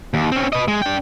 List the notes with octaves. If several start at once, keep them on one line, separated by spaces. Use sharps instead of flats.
D#2
C4 C#4
B4 D#5
G#3
D4 G5